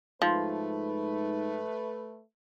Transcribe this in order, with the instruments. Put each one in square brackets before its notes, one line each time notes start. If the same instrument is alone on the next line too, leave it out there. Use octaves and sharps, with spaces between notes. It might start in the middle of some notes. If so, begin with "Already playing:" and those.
[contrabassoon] G#2 [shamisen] F3 [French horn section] A3 B4